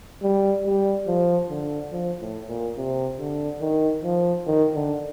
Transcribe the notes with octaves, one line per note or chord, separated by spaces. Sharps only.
G3
G3
F3
D3
F3
A2
A#2
C3
D3
D#3
F3
D#3
D3